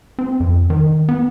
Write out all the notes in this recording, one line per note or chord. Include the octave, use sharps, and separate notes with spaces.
C4
F2
D#3
B3